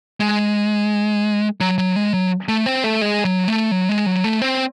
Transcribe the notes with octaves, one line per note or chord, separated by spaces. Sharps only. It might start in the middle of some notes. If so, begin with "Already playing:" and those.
G#3
F#3
F#3
G#3
F#3
A3
C4
A3
G#3
F#3
A3
F#3
G#3
F#3
A3
C4